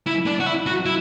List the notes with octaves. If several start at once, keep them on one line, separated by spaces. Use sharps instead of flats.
E4
D4
F#4
E4
F#4
E4